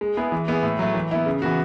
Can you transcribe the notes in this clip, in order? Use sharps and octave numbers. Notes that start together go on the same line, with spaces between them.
G#3
B3 E4 G#4
E3
B3 E4 G#4
A2
F#3 A3
E3
B3 E4
C#3
E3 B3 F#4